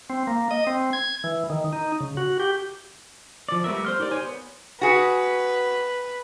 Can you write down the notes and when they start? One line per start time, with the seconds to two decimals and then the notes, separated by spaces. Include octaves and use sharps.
0.10 C4
0.27 A#3
0.51 D#5
0.67 C4
0.93 G#6
1.24 E3
1.50 D#3
1.73 D#4
2.01 C#3
2.17 F#4
2.40 G4
3.49 F3 D5
3.64 G3 A3 B3 A#4 E5
3.85 C5 C6 F6
4.00 D#4 G4 A#4 D5
4.11 C5 C#5 G#5 C6
4.24 B3
4.81 F#4 G#4 B4